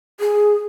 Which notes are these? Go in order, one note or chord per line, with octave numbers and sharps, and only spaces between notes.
G#4